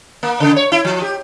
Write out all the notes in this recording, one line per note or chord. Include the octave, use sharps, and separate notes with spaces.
A#3
C#3
C#5
E4
F3
G4